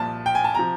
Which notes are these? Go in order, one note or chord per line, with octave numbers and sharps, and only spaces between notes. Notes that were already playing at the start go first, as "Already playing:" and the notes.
Already playing: C2 A#2 F3 A5
G5
G#5
A5
C3 F3 A#5